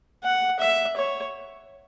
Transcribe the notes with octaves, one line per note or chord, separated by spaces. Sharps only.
F#5
E5
C#5